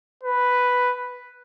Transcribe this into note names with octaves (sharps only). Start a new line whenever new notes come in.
B4